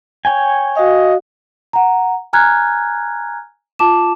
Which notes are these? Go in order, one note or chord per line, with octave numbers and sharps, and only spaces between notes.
C#5 G5 G#5
F#4 D#5 F5
F#5 A#5
G#5 A#5 F6 F#6 G#6
F4 A5 D6 E7